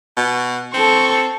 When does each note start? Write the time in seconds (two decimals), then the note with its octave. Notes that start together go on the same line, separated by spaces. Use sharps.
0.17 B2
0.74 C4 A4 C#6